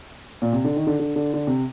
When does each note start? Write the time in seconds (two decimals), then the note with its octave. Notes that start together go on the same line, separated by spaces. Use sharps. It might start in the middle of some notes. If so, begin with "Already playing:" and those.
0.42 A#2
0.53 C3
0.64 D3
0.76 D#3
0.87 D3
0.99 D3
1.16 D3
1.34 D3
1.47 C3